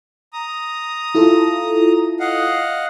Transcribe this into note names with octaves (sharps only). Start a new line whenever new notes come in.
A#5 D#6
E4 F4 A4
D#5 F5 F#5